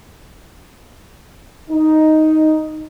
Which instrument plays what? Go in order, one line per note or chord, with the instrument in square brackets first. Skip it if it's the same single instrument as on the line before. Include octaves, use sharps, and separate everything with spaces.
[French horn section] D#4